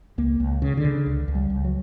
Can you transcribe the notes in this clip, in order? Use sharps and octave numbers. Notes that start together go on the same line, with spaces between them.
C#2 A#3
C#2
C#3
D3
C#3
C#2
C#2
G3
C#2
F#3